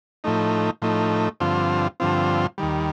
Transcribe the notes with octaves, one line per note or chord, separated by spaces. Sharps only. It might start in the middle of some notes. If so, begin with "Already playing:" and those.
A2 F3 A3 D#4
A2 F3 A3 D#4
G2 D3 F3 C4 F4
G2 D3 F3 C4 F4
D#2 D#3 G3